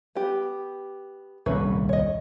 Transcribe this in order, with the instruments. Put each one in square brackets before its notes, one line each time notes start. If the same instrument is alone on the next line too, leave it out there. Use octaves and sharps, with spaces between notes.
[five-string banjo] B3 G4
[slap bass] D#1 C2 G2 [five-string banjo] C#4 B4 E5
[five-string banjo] C#5 D#5